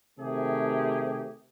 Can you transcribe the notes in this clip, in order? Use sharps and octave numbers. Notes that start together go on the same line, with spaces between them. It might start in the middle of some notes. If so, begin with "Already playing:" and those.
C3 D#3 A3 G4 G#4